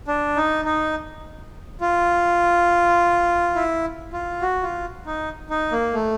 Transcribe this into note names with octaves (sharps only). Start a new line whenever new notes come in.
D4
D#4
D#4
F4
E4
F4
F#4
F4
D#4
D#4
A#3
A3